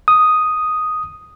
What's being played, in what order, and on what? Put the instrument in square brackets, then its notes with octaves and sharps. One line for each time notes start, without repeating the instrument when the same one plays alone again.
[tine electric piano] D#6